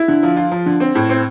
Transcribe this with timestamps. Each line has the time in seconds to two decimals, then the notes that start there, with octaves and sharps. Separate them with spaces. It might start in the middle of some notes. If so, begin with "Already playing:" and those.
Already playing: E4
0.08 D3
0.23 F3
0.37 F4
0.51 F3
0.66 D3
0.80 C4
0.95 A2
1.09 C4